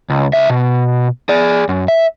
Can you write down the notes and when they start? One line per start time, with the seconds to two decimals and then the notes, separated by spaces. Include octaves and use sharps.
0.10 C#2
0.33 C#2 E5
0.50 B2
1.29 G#4 D5
1.69 F#2
1.88 E5